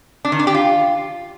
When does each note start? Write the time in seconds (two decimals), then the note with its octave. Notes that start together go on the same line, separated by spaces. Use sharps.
0.25 D4
0.32 D#3
0.39 D4
0.47 G4
0.54 F4